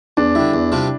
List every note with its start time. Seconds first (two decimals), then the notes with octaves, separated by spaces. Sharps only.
0.17 E2 D4
0.35 D3 G3 E4
0.54 E2
0.72 C3 G3 D4 F4